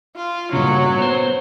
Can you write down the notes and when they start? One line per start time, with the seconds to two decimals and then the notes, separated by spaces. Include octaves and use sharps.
0.16 F4
0.53 G2 A#2 C#3 F#3
0.98 B3 C5